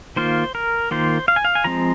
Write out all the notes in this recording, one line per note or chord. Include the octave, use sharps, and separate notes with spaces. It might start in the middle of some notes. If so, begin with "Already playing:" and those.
D#3 A#3 F4 C5
A#4
D#3 A#3 F4 C5
F5
G#5
F5
G#5
F3 G#3 C4 A#5